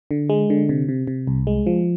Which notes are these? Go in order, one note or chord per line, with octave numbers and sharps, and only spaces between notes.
D3
G#3
D3
C3
C3
C3
C2
G#3
F3